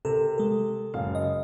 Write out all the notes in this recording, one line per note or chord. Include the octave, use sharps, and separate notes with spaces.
C3 A4 A#4
G#3 A4
F#1 F5
D#5